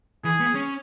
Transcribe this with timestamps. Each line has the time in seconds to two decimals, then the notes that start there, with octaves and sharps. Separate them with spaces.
0.24 E3 G#4
0.40 B3
0.55 C#4